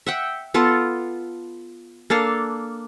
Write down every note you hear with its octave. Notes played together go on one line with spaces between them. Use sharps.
E5 F#5 G5
B3 F4 A4
A#3 D4 A4 F5